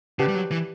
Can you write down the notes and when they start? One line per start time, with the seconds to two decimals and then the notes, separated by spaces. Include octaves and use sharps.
0.19 C#3 G4 B4 F#5 A5
0.28 G3
0.35 F#3
0.51 E3